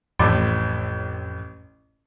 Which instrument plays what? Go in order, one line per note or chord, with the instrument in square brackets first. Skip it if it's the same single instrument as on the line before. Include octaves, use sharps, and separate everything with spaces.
[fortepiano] A1 A2 [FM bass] F2